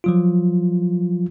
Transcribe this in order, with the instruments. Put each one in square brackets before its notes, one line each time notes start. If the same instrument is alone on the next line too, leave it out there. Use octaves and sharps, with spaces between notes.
[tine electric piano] F3 F#3 F4